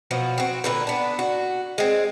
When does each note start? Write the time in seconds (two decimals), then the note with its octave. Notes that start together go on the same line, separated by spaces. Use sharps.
0.11 B2 F3 F#3 F#4
0.38 C4 F#4
0.64 A#2 D3 B4
0.87 B3 D4
1.19 F#4
1.78 G#3 C4